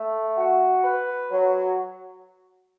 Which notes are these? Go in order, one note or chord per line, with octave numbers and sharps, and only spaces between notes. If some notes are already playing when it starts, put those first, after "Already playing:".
Already playing: A3
F#4
B4
F#3